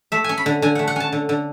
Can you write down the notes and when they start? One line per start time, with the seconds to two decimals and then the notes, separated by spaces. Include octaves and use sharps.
0.12 A3 E5
0.24 C#4 G#5
0.38 B5
0.46 D3
0.62 D3 G#5
0.75 A3 F#5
0.87 F#5
0.96 C#4 A5
1.12 D3
1.29 D3